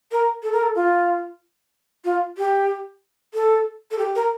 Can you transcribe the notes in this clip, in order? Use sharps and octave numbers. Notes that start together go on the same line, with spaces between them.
A#4
A4
A#4
A4
F4
F4
G4
A4
A4
G4
A#4